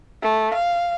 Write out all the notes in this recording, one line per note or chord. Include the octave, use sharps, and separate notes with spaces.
A3
F5